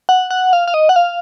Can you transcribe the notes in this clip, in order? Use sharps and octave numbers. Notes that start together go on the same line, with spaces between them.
F#5
F#5
F5
F5
D#5
F#5
F5